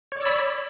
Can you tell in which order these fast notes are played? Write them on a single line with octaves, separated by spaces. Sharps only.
C#5 D5 E6 B5